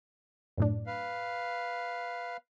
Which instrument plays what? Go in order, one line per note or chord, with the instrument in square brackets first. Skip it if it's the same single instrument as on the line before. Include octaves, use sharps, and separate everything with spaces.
[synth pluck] F#2 A2 D4
[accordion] B4 F5